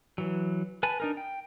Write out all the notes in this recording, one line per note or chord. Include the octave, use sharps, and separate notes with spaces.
E3 F#3
B4 G#5 A5 B5
D4 D#4 A#4
G5